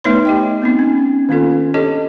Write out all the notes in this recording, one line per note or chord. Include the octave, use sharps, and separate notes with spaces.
A3 B3 D#4 B4 C#5 C6
G4 D#5 G5
B3 C4 D#4
C#4
D#3 A#3 C#4 F4 A4
D4 G4 A4 C#5 D#5